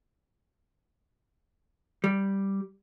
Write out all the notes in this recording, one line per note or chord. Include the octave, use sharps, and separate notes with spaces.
G3